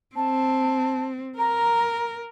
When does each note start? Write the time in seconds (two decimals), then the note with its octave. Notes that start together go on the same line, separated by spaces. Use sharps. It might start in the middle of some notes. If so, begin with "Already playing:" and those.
0.16 C4 A5
1.39 A#4 A#5